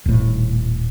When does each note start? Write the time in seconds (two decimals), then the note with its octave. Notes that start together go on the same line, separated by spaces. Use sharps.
0.06 D#1 A2